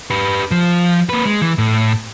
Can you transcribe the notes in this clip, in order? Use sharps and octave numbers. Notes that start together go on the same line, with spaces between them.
G4 B4
F3
A#3 B4
G#3
E3
A2